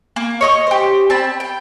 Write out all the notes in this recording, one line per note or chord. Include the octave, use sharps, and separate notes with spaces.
A#3
C#5 D#5 C#6
G4 C5
C4 A5 B5
G5